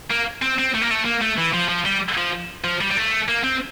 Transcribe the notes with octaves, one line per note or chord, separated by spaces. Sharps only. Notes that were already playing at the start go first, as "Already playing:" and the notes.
A#3
C4
C4
A3
A#3
A3
A#3
A3
E3
F3
F3
G3
F3
F3
G3
G3
A3
A#3
C4